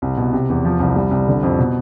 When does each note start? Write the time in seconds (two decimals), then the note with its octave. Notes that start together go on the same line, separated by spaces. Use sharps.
0.02 C2
0.17 B2
0.33 C3
0.50 E2
0.65 F3
0.80 C2
0.96 G3
1.11 C2
1.28 D3
1.43 F2
1.59 B2